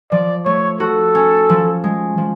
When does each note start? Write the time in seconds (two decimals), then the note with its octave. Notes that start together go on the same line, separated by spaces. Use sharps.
0.12 F3 D5
0.45 A3 C#5
0.80 F#4 A4
1.15 C#4
1.49 F3
1.84 G#3
2.18 F3